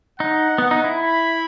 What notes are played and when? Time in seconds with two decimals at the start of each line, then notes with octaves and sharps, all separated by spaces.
0.20 D#4 F#5
0.58 B3
0.71 D#4
0.84 E4
0.98 B5